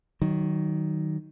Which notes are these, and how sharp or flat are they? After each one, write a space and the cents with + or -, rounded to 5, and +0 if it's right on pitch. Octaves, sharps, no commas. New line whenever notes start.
D#3 +0 F#3 +20